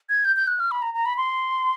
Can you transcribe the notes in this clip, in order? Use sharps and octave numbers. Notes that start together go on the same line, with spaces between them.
G#6
G6
G6
F#6
F6
B5
A#5
A#5
B5
C6